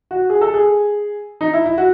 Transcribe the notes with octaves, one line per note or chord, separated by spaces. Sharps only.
F#4
G#4
A4
G#4
D#4
E4
E4
F#4